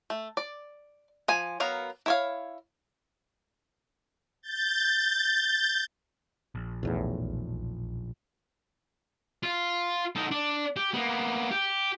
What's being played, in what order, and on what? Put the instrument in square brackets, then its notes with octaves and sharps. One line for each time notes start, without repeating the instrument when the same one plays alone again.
[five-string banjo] A3
D5
F3 G#5
F#3 B3 A#4 F5
E4 C#5 F5
[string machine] G6 A6
[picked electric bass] A#1
[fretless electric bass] B1 E2 A2
[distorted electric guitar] F4
D#4 A4
D4
G4
A#3 B3
G4